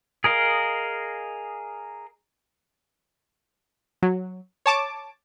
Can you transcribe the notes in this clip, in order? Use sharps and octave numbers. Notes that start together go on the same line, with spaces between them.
G#4 A#4 D#5 F5
F#3
C#5 A5 D6